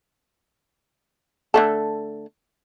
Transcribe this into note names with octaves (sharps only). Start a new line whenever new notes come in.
D3 A3 A4